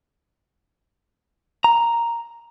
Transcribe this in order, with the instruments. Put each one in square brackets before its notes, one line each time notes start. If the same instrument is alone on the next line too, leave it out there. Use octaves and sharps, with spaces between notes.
[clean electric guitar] A#5